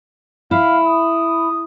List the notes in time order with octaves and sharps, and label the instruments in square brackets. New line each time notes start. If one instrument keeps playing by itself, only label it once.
[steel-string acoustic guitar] E4 [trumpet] F5
[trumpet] D#6